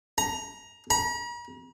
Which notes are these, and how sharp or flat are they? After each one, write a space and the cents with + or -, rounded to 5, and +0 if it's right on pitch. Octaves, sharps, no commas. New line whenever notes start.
A#5 +20
A#5 +45